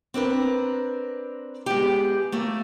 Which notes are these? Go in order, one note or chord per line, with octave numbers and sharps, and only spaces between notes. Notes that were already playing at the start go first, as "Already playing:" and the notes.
C4 D4 A#4 B4
G#3 B3 E4 G4
A3 A#3 F4